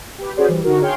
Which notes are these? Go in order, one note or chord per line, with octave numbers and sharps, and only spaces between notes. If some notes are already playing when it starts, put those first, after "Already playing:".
G4 B4
C#4 F#4 G#4 B4 C5 D5
E3 G3
D3 D#4 F#4 A#4
G#4 C#5 F5 G5 C6